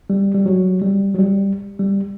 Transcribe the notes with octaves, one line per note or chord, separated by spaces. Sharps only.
G3
G3
F#3
G3
F#3
G3
G3